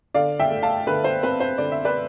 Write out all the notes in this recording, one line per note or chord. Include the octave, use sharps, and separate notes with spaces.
D3 D5 F5
E5 G5
A3
F5 A5
D3 B4
C5
C4 B4
C5
D3 D5
E5
B4 D5